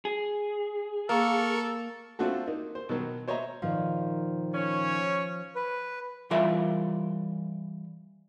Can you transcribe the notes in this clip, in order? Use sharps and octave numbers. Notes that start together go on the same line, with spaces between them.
G#4
A#3 A4 A#4 C#6
A3 C4 D4 F4 F#4 A4
A#3 D#4
C5
B2 D#3 F#3
C5 C#5 D#5 E5 A#5
A#2 D#3 F3
C#4 C#5
B4
E3 G3 F4 A#4 E5